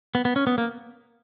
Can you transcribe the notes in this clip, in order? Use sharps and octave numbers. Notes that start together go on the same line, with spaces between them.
B3
B3
C#4
B3
A#3